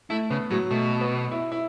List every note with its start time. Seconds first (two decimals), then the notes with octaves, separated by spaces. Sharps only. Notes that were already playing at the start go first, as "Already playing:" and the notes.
0.10 A3 E4
0.30 C#3 B3
0.50 A2 F#3
0.70 B2 A3
1.01 B3
1.31 E4
1.52 E4